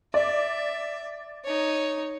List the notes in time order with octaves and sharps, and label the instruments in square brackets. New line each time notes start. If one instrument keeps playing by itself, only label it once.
[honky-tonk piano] D5 [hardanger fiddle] E5
[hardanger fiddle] D#4 C#5